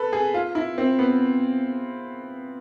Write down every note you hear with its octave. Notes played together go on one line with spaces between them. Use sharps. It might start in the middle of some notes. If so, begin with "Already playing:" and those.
Already playing: A4 B4
G#4
F4
E4
C4
B3